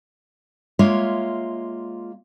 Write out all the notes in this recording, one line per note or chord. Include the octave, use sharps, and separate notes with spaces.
G#3 A#3 F4 C#5 E5